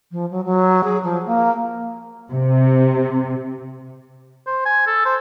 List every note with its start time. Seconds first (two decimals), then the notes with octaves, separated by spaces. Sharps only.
0.12 F3
0.31 F#3
0.45 F#3
0.84 G#4
1.03 F3
1.26 A#3
2.32 C3
4.47 C5
4.66 G#5
4.87 A4
5.05 C5